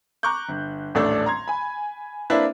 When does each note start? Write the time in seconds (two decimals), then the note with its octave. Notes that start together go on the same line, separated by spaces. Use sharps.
0.23 A#5 C#6 D6 F#6 G6
0.49 G1
0.94 D#1 A1 A3 D4 D5 E6
1.26 A#5 C6 G#6
1.48 G#5 B5
2.30 A#3 C4 D4 E4 B4 E5